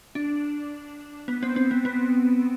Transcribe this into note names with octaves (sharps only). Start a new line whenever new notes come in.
D4
B3
C4
C4
B3
B3